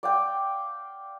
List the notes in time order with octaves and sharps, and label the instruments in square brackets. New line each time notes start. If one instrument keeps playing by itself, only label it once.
[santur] D5 F5 G5